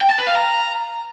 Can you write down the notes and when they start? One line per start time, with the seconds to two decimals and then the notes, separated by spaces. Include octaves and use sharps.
0.01 G5
0.10 A5
0.18 B4
0.27 F5
0.35 A#5